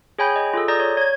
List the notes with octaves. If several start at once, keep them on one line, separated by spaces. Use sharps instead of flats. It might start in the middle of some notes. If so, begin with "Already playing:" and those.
G#4 C#5 G5 G#5 B5 G6
D#5
F4 G#4 A4
D5 A#5 D#6 G6 A#6
C#5
C#5 G#6